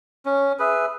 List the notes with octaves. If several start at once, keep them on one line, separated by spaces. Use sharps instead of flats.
C#4
G#4 B4 E5